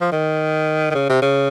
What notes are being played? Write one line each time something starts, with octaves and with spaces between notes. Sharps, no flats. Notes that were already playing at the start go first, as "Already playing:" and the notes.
F3
D#3
D#3
C#3
C3
C#3